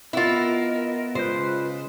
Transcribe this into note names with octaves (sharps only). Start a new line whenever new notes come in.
B3 E4 F4 A#4 D#5
C#3 G#3 F4 B4 C5 G6